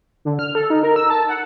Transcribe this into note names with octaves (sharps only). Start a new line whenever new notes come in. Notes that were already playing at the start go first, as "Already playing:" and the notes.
D3
F6
A4
D#4
A#4
E6
A5
F#5